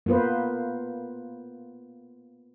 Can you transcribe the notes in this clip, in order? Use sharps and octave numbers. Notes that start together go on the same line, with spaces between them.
A#3 B3 F4 B4 C5